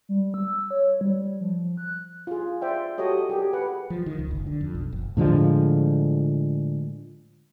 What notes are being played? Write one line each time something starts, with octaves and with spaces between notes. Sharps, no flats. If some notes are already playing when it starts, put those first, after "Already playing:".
G3
E6
C#5
G3
F3
F#6
F4 G#4
C5 D5 E5 G5
F#4 G4 A4 C#5 D#5
G4 G#4 A#4
B4 F#5
F3
D#3
C#2
F#1
D3
F2
B1
F#1
A2 D3 F3 G#3